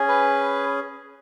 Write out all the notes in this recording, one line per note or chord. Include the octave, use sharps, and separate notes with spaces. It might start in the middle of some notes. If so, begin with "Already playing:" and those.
Already playing: C#4 G#4
B4